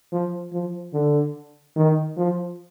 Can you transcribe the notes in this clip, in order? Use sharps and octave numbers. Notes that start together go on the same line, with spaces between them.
F3
F3
D3
D#3
F3